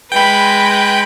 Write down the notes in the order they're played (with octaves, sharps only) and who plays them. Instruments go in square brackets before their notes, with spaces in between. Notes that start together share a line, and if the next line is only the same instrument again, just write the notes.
[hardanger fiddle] G#3 B4 [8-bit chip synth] G5 B5